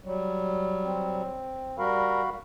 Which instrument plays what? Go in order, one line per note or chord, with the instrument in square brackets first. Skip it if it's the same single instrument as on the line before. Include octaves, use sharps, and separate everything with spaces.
[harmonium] F#3 G3
[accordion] C4
[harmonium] G3 A#4 [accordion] F#4 F5 B5